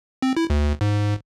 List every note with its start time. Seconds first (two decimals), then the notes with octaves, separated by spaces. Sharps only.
0.22 C4
0.37 E4
0.50 D2
0.81 G#2